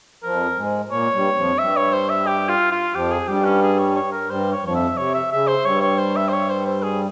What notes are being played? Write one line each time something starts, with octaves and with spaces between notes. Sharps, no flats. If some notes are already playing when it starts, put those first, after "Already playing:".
F2 F3 A#4
G#2 G#3
A#2 A#3 C#5
G2 G3
F2 F3
G2 G3 E5
C#5
C5
E5
G4
F4
F4
F2 F3 G4
G#4
G2 G3 G4
C#4
G#4
C#5
C#5
A#4
G2 G3 C5
C#5
F2 F3 C#5
E5
C3 C#5
E5
C#3 E5
C5
G2 G3 C#5
C#5
C5
E5
C5
C#5
C5
C5
G#4